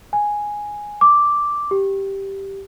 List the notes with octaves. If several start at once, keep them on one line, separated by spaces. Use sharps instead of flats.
G#5
D6
G4